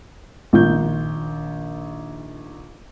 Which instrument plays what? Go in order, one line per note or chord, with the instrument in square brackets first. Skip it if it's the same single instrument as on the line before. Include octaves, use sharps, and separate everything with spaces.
[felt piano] A#1 D#3 G6